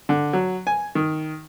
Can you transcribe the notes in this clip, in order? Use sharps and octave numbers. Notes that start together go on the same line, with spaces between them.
D3
F#3
G#5
D#3